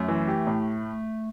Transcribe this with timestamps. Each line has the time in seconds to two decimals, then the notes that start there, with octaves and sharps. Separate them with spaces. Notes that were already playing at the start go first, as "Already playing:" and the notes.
Already playing: F#2 A3
0.08 E3
0.28 G4
0.47 A2